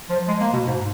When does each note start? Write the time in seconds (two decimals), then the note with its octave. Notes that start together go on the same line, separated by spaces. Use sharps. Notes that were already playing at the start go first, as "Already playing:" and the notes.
0.10 F3
0.28 G#3
0.41 A#3
0.54 B2
0.66 G#2